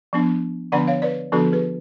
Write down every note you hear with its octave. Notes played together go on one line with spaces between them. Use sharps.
F3 B3 D4
D3 F3 B3 D4 D5 F#5
C#5 F5
B4 D5
D3 F3 B3 D4 F#4 A4
G#4 B4